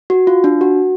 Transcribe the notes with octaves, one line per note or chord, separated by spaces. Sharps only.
F#4
F4
D4
F#4